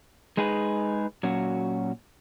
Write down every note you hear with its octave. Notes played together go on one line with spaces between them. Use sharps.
G#3 D#4 G#4 B4
A#2 F#3 C#4 F#4